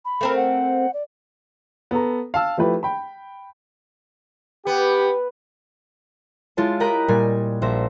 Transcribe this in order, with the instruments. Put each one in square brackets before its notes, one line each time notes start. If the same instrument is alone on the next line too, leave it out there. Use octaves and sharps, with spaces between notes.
[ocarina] B5
[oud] A3 C4 A#4
[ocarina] F#5
D5
[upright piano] B3 A4 A#5
F5 A5 E6
F3 A3 E4 G4 B4
G5 B5
[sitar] B3 [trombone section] G4
[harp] G#3 E4 F4 C#5 A5
G4 A#4 D#5 A#5 B5 F#6
A#2 G3 G#5
A#1 C5 E5 A#6